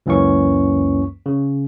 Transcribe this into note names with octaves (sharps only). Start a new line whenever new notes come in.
C#2 F#2 E3 A#3 C#4 C#6
C#3